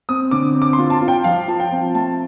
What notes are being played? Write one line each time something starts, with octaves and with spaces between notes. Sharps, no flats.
C4 D#6
D3 D6
C4
D6
C6
F4
A5
F4
G5
F3 F5
F4 A5
G5
C4
A3 A5